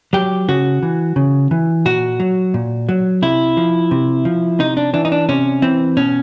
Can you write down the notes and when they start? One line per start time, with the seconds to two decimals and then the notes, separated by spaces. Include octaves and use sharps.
0.13 F#3 G4
0.48 C#3 F#4
0.83 E3
1.16 C#3
1.51 E3
1.85 A#2 F#4
2.20 F#3
2.54 A#2
2.89 F#3
3.22 C3 E4
3.57 F3
3.91 C3
4.25 F3
4.60 C3 D#4
4.77 D4
4.94 E3 D4
5.05 D#4
5.12 D4
5.29 C3 C#4
5.62 E3 C4
5.97 B2 C#4